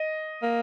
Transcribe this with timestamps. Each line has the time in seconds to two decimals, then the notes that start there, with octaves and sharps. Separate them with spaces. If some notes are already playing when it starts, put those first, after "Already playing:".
Already playing: D#5
0.43 A#3